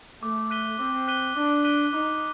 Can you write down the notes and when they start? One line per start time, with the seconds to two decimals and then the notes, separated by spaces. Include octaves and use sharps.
0.22 A3 D6
0.50 F#6 B6 D#7 G7
0.79 C4 D6
1.08 F#6 B6 D#7 G7
1.36 D4 D6
1.64 F#6 B6 D#7 G7
1.93 D#4 D6